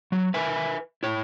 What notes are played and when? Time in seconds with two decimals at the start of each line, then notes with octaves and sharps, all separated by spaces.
0.12 F#3
0.34 A#4 B4 E5 G#5
1.03 E4 C#5